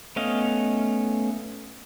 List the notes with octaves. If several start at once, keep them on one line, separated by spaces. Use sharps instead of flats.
A3 B3 C#4 D#5 F5